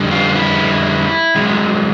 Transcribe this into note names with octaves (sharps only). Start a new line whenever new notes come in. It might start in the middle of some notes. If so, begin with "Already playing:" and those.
Already playing: F2 D3 G3
F4
E4
F#2 D#3 G#3